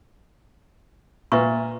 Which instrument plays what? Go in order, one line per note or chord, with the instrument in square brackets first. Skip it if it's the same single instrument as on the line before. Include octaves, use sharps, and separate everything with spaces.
[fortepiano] A#2 [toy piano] B4 E5 C#6